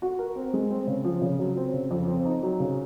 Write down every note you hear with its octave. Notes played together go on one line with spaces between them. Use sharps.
F#4
A#4
C4
G#3
C4
C#3
F3
C#3
F#3
C4
C#3
F2
C4
D#4
F#3
C#3